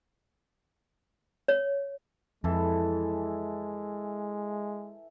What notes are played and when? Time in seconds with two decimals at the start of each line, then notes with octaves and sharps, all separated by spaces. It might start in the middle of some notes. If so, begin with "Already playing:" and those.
1.48 C#5
2.44 F2 E3 G#3 A4